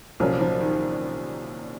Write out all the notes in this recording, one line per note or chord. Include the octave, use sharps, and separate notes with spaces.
C2 A#2 F3 F#3 C#4
F3
D#3